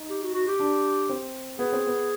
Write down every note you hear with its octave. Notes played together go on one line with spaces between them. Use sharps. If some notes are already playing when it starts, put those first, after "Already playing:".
Already playing: D#4
G4
F#4
F#4
G4
D4
C4
B3 G#4
C4
B3